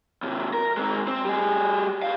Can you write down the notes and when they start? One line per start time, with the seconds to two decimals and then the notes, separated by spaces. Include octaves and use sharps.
0.23 D#2 C3
0.54 A#4
0.77 G#3 C4
1.08 C4
1.25 G3 G#4
2.02 G3 F5